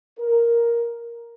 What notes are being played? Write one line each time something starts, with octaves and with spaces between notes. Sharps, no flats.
A#4